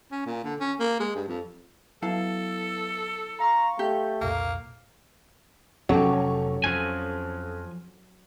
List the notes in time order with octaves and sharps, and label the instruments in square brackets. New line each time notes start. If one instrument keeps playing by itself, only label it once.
[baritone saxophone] C#4
A#2
D3
C#4
A#3
G#3
G2
F2
[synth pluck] F#3 B3 E4 [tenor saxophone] A4 [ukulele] F5 A5
[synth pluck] F5 C6 C#6 [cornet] A#5
[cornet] A3 [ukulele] G4 [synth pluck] G6
[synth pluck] C2 F2 A#2 [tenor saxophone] A#3
[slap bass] F1 [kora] F#3 G4 [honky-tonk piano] C#4 A4 C#5
[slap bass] F2 [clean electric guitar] F3 G#5